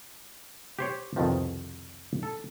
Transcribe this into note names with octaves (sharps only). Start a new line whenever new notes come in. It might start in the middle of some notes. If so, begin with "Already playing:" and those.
G4 C5 C#5
C2 F2 B2 D#3 F3
A4